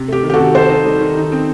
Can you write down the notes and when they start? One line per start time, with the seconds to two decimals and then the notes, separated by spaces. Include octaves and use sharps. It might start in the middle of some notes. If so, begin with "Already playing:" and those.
Already playing: C3
0.08 A3 G4
0.23 D#3
0.30 G4
0.34 F#4 A4
0.39 C3
0.54 G4 A4 C5
0.70 D#4
0.85 G3
1.01 D#3
1.17 D#4
1.32 C4